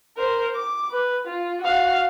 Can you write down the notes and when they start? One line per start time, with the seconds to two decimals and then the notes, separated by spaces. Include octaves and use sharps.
0.17 A#4 C5
0.55 D6
0.91 B4
1.27 F4
1.61 F#4 F5